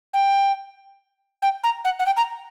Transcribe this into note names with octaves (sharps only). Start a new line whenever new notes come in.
G5
G5
A#5
F#5
F#5
G5
A#5